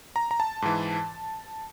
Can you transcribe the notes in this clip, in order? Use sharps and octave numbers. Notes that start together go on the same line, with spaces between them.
A#5
A#5
A5
G#2 E3